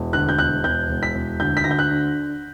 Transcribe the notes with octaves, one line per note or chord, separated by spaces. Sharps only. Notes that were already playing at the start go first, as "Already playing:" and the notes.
Already playing: E1
D2 F#6
G6
E1 F#6
E1 G6
E1
B6
E1
D2 G6
B6
D2 A#6
G6
F#6
D3